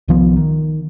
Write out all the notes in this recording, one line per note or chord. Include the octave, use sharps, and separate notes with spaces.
C2 D#3 F3 B3
D#3